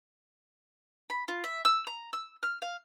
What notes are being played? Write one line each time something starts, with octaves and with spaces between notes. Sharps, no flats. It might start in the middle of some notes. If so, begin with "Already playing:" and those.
B5
F4
E5
E6
A#5
E6
F6
F5